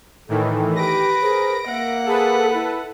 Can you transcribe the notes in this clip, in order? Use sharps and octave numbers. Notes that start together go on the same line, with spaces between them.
A2 D#3 E3 A4
G4 B4 A#6 D7
G#4 A#4 C5
A#3 E5 F#5
G#4 A4 B4
E4